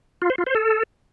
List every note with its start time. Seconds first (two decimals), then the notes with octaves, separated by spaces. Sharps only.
0.22 F4
0.30 C5
0.38 F4
0.46 C5
0.55 A4